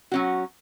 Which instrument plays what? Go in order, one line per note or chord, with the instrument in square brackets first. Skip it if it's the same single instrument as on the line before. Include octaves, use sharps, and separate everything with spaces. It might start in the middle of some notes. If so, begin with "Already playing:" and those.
[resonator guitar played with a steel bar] F#3 C#4 F#4